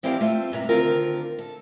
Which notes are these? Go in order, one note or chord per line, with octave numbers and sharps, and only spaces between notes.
F3 C4 E4 G4 D5 F5
A3 C4 F4
G2 C3 A#5
D2 D3 D#3 C4 F4 A#4
A4